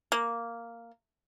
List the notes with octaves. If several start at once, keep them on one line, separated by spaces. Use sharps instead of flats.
A#3